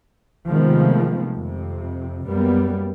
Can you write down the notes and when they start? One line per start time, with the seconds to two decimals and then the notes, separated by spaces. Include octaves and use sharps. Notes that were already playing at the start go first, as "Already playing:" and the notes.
0.48 C3 D#3 F3 G#3 A3 B3
1.36 F2 C3
2.27 F#2 G3 A#3 B3